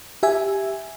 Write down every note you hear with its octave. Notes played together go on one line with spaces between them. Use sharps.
G4 E5 G#5